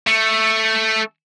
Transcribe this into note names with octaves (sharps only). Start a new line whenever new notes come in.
A3